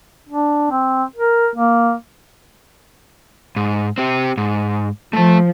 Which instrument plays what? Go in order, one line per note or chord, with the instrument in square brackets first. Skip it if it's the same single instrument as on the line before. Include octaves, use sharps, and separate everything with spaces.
[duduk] D4
C4
A#4
A#3
[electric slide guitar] G#2
C4 G4
G#2
[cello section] F3 [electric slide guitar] A3 A5